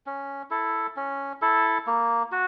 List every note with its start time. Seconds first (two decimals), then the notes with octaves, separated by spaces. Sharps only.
0.06 C#4
0.50 E4 A4
0.96 C#4
1.42 E4 A4
1.87 A#3
2.32 F#4